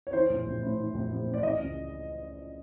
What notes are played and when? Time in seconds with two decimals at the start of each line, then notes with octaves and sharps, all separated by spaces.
0.07 C#5
0.13 E3 C5
0.30 A#1
0.46 A#1
0.62 A2
0.79 E3
0.94 A#1
1.10 A#1
1.26 A2
1.34 D5
1.42 E3 D#5
1.59 C#2